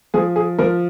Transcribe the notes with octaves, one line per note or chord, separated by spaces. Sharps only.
F3 G#4
G#4
F3 A#4